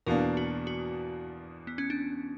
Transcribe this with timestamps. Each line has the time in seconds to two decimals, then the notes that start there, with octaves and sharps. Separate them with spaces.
0.06 E2 B2 A#3 D4 A#4
0.37 F#4
0.67 F#4
1.67 B3
1.78 C#4
1.90 D4